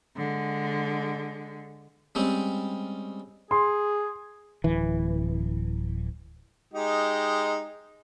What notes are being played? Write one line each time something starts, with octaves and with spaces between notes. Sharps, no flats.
D3 G#3
G3 G#3 C4 C#4
G#4 C6
D1 E3
G#3 D#4 G4